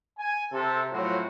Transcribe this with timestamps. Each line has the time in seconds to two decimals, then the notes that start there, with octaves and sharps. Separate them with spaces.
0.18 G#5
0.52 C3 A4
0.92 A2 F3 F#3 C4 F#4